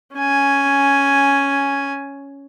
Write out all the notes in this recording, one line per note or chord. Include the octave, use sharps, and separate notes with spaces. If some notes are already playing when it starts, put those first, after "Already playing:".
C#4 G#5